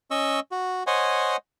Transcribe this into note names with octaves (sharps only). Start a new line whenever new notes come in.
C#4 D#5 C#6 E6
F#4
C5 C#5 D#5 F#5 G#5